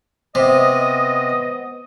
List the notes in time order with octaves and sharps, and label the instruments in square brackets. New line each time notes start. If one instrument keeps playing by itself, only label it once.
[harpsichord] C3 [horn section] B3 D#5